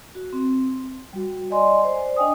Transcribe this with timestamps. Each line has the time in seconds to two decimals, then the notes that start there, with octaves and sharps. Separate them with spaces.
0.15 F#4
0.33 C4
1.13 G3 F#4
1.50 D5 D#5 G#5 C6
1.81 C5 D5
2.16 D4 D#5 G5 G#5 D#6